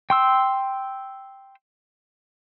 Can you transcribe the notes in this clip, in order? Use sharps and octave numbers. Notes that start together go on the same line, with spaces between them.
G5 C6 E6